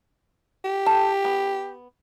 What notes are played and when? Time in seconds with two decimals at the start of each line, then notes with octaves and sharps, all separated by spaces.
0.64 G4
0.86 A4 G5
1.25 B3